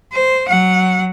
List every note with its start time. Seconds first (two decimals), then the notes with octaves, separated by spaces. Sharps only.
0.13 C5
0.48 F#3 F#5